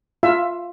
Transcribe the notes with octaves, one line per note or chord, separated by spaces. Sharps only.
F4 E5